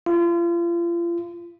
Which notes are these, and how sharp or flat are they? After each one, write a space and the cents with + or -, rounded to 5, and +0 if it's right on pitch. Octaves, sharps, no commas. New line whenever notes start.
F4 -35